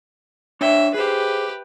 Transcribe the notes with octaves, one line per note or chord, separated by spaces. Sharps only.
D4 C#5 E5 G5
G4 G#4 B4 C5